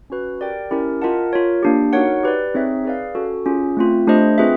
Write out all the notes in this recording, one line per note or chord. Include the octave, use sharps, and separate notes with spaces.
C#4 F#4 B4
G4 A#4 D5 G5
C#4 E4 G4 A#4
F4 A#4 D#5 F#5 A5
F4 A#4 C#5
A#3 D4 G4
D#4 F#4 A#4 C#5 F#5
G4 B4 D5
C4 D#4 G#4 C#5 E5
G#4 B4 D5 F5
C#4 F#4 A4
C#4 F4 G#4
A3 C4 F4
A3 D4 G4 C5 D#5
C4 F4 G#4 B4 E5